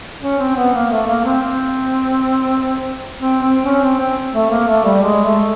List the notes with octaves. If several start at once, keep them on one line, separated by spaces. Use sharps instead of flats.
C#4
C4
B3
A#3
A3
A#3
C4
C4
C4
C4
C#4
C4
C4
A3
A#3
A3
G3
G#3
A3